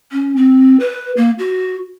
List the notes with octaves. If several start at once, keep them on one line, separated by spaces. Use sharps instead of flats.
C#4
C4
B4
A#3
F#4